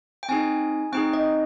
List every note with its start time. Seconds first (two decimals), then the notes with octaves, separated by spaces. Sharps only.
0.23 G5
0.29 C4 D#4 G#4 G#5
0.92 C4 D#4 G#4 G5
1.13 D#5